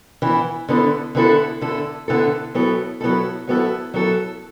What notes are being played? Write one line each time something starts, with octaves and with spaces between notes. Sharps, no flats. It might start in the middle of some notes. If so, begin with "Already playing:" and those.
E3 B3 E4
D3 B3 E4 A4
D3 B3 E4 A4
D3 B3 E4 A4
D3 B3 E4 A4
F#3 B3 E4 A4
F#3 B3 E4 A4
F#3 B3 E4 A4
F#3 B3 E4 A4